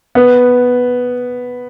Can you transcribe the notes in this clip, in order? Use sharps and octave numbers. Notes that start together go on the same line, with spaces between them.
B3